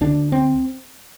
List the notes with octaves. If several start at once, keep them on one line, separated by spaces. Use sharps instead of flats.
D2 D3 D4
C4